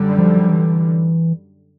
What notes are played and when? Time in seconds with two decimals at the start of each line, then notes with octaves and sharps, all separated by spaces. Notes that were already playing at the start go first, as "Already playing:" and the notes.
Already playing: F#2 D3 G3
0.19 F3
0.49 E3